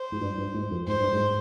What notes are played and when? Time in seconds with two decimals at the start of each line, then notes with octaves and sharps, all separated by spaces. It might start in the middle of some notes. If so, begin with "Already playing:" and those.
Already playing: C5
0.12 G#2
0.21 G2
0.38 G2
0.54 G#2
0.71 F2
0.87 G#2 C5
1.00 G2
1.12 G#2